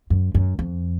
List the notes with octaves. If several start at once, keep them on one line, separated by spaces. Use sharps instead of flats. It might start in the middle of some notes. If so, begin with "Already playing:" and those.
F#2
F#2
F2